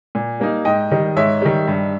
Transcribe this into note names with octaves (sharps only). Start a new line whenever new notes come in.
A#2
G3 A#3 D#4
G#2 D#5 G5
D#3 G3
G#2 C#5 E5
D#3 G3
G2